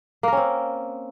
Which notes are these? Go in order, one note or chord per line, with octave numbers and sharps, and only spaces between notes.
A#3 C4 C#4 A#4